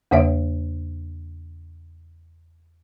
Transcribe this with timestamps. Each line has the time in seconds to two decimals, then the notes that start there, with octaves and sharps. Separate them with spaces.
0.11 E2 C#3 A#3 C#5 E5